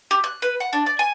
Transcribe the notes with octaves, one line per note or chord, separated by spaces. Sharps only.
G4
F#6
B4
F#5
D4
D5
G#5